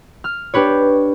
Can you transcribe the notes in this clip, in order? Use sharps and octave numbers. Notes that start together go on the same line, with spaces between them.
F6
D4 G4 B4 C#5